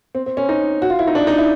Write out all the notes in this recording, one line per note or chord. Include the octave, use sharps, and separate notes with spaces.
C4
C4
C#4
D#4
F#4
F4
E4
D#4
D4
D#4
E4